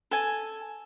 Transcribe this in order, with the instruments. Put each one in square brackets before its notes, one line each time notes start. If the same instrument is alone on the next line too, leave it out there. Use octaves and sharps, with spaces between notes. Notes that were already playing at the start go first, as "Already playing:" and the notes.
[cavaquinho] A4 G#5